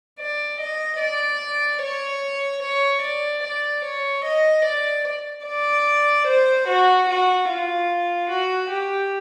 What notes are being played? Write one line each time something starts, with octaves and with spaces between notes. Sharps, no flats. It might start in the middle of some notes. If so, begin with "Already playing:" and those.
D5
D#5
D5
C#5
C#5
D5
D5
C#5
D#5
D5
D5
C5
F#4
F#4
F4
F#4
G4